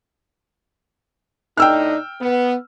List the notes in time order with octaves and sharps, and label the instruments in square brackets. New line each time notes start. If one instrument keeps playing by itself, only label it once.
[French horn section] A2 D4 D#4 [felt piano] G5 E6 F6
[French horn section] B3